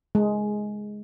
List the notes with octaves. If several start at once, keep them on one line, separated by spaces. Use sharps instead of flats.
G#3